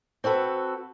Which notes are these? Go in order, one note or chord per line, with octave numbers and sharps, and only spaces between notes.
C4 F#4 A4 B4